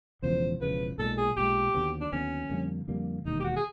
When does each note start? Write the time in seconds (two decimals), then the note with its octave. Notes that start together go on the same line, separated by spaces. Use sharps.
0.22 E1 E2 C#3 F3 C5
0.60 E1 E2 C#3 F3 B4
0.98 B1 A#2 F3 G#3 A4
1.17 G#4
1.36 B1 A#2 F3 G#3 G4
1.74 D#2 D3 F#3 B3
2.01 D4
2.12 D#2 D3 F#3 B3 C#4
2.49 F2 D3 G3 A#3
2.88 F2 D3 G3 A#3
3.25 E1 D#2 D#3 D#4
3.40 G4
3.44 F#4
3.56 G#4